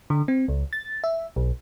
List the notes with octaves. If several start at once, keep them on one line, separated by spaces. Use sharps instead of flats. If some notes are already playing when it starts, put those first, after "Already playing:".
D3
C4
C#2
A6
E5
B1